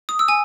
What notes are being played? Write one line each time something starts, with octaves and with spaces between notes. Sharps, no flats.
D#6
E6
G#5